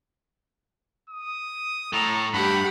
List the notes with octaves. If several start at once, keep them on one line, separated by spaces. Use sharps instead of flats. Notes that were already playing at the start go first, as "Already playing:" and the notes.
D#6
A2 A4 A#5
G2 G4 F#5 B5